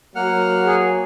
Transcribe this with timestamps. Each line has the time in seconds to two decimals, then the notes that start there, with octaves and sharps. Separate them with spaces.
0.16 F#3 A#3 F#5 F6
0.64 G#4